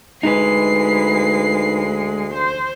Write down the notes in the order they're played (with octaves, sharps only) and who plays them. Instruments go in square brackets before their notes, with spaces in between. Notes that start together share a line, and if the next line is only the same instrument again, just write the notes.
[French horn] D2 [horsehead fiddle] G#3 [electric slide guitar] D#4 B4 [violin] C7
[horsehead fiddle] C5